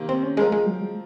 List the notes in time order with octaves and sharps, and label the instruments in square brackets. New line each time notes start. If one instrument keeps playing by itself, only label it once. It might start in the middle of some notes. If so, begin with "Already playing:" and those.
Already playing: [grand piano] C3 D#3 A#3
[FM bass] C4
C#4
[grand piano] F3 C4 F4 A#4 [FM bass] G#3
[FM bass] G#3
F#3
G#3